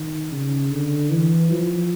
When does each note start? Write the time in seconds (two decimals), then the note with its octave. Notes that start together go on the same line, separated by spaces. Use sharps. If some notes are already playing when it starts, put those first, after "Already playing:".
Already playing: D#3
0.32 C#3
0.71 D3
1.10 E3
1.51 F3